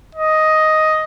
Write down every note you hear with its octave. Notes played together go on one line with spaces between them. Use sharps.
D#5